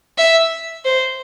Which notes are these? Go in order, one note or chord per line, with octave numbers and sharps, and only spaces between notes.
E5
C5